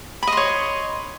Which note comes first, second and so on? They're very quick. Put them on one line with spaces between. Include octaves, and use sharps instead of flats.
B5 D#5 C6 C#5